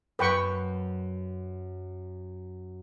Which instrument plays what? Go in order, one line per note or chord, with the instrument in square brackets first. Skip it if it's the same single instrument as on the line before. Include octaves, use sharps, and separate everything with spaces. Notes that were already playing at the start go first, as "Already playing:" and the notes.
[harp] F#2 [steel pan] B4 G5 C#6